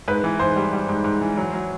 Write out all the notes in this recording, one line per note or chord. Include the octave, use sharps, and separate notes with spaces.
G#2 B4
E3
G#2 C5
G3
G3
G#2
G#2
E3
F#3
F#3